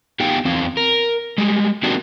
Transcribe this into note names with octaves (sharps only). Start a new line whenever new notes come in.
B3 D#4 G4 F5 G5 G#5
E2 C4 F5
A#4
G3 G#3
A#3 C4 D4 D#4 F#4 G4